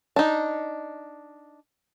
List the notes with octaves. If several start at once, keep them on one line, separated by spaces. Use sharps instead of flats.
D4 D#4